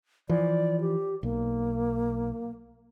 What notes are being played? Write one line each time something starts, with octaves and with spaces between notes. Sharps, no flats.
E3 F3 D5
G4
B1 A#3